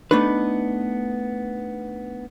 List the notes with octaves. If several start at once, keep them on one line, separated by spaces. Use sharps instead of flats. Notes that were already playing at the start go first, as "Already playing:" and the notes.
A3 B3 D4 D#4 B4